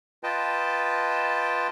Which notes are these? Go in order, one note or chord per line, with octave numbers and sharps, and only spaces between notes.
F4 B4 D#5 G5 A5